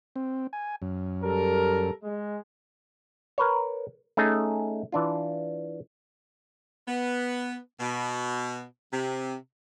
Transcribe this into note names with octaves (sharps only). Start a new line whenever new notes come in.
C4
G#5
F#2
G3 A4 A#4
G#3
A#4 B4 C#5
A3 C#4 D#4 G#4
E3 D4 F4
B3
B2
C3